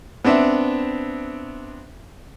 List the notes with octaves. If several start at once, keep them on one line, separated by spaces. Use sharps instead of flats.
B3 C4 D4 E5